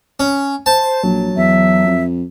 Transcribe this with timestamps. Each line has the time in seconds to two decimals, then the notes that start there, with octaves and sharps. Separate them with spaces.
0.20 C#4
0.66 C5 A5
1.04 A#1 F#3
1.37 E2 E5
1.87 F2